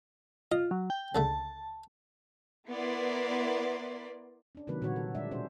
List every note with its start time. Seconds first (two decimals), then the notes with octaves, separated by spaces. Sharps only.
0.52 F4 D#5
0.71 F#3
0.90 G5
1.15 C#2 D3 A3 A5
2.68 B3 E4 A#4 B4 D5 C6
4.55 C#4 D4
4.67 C3 D#3 F#3 A#3 B4
4.82 A#2 D3 E3 G3 F#4 C#5
4.96 A4
5.15 G#3 D4 E5
5.31 B2 C#4 D4 C5